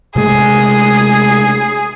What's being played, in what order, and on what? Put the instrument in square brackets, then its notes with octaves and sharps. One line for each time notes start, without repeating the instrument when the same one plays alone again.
[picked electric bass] C3 G#3 A3 [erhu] G#4